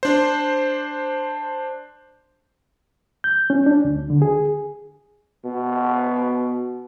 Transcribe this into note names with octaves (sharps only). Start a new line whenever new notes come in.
D4 C5
G6
C#4
D4
D2
D3
G#4
B2